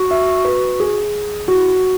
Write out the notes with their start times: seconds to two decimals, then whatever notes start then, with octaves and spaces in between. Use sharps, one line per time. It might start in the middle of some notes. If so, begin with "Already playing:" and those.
Already playing: F#4
0.11 E5
0.45 B4
0.80 G#4
1.48 E4 F#4